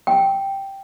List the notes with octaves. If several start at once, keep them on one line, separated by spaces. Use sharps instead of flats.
G5